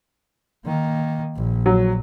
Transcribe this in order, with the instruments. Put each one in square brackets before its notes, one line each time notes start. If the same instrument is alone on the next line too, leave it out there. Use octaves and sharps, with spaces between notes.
[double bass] D#3 A#3
A#1
[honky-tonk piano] F#3